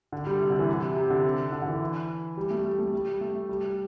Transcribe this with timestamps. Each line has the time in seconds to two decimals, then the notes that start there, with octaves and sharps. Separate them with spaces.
0.12 D3
0.26 G3
0.41 C3
0.50 D3
0.59 E3
0.69 C3
0.96 C3
1.10 D3
1.52 D3
1.62 D3
1.67 E3
2.37 G3
2.51 A3
2.65 G3
2.79 A3
2.93 G3
3.21 A3
3.49 G3